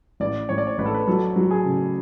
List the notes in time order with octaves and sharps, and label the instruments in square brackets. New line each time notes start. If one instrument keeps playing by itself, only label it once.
[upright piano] A1 [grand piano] D5
[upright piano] A1 [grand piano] C#5
[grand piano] D5
C#5
[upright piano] A1 [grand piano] B4
[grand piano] A4
B4
[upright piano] F#3 [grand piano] A4
[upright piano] F#3
[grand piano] G#4
[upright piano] C#3